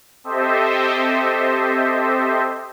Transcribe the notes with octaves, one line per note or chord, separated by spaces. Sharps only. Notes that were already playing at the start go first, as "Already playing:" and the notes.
C4 G4 A4 C5 D#5 E5